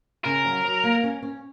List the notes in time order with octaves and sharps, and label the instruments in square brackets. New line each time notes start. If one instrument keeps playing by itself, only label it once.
[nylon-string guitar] C#3 [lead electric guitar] A#4
[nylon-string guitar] F#3
F#3
A#3
C#4
C#4